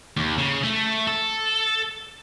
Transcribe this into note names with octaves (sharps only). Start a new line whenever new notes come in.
D#2
C#3
A3
A4